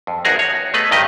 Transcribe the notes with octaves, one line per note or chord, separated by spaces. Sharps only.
F2
E2 D#4 F#4 G#4 A#4
C#5
A3 B3 G#4 B4 D#5
G2 D#3 G4 D#5